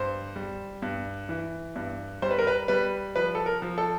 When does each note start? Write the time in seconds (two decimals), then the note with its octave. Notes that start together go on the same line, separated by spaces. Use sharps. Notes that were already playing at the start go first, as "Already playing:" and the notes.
Already playing: G2 C5
0.36 G3
0.82 G2
1.29 E3
1.76 G2
2.22 G3 C5
2.31 B4
2.38 A#4
2.47 B4
2.68 G3 B4
3.16 F3 B4
3.35 A4
3.46 A#4
3.62 F3
3.78 A4